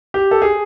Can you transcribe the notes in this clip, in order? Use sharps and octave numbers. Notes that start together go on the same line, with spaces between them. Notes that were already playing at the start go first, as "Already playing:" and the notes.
G4
A4
G#4